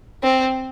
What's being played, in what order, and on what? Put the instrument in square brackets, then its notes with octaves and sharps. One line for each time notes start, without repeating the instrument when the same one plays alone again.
[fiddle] C4